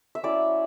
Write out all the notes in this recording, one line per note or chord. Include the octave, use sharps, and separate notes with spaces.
E5
F#3 C#4 E4 D5